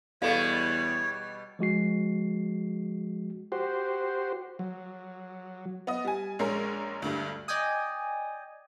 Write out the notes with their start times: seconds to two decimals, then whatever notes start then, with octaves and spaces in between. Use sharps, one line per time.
0.22 E2 B2 G3 A4 C#5 F5
1.59 F3 G#3 F#4 C7
3.52 F#4 G4 C5
4.59 F#3
5.87 B3 D#5
6.05 G3 G#5
6.39 A#1 G#3 C#4 A#4
7.02 D2 G2
7.48 D5 D#5 G5 G#5 D#6